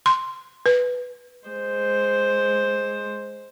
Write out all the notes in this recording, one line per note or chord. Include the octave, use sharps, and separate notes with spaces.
C6
B4
G#3 C5